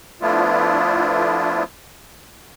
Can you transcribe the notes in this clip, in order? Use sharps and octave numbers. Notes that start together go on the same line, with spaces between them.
F3 A3 B3 D4 E4 F4